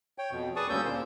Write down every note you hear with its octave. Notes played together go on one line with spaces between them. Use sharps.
C#5 G5
F2 B2
G#4 B4 D5 A5 C#6 D#6
D2 G3 A#3 C#4 E6 G6
A#2 A#3 C5